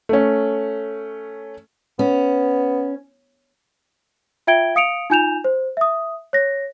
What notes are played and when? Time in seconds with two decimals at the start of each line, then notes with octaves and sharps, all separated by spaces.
0.09 A3 C#4
1.99 B3 C#4
4.47 F4 E5 G5 G#6 D7 G7
4.75 F5 D#6 C#7 D7 F7
5.10 D#4 F4 G#5 G6 E7 F7
5.44 C5
5.77 E5 D#6
6.33 C#5 A#6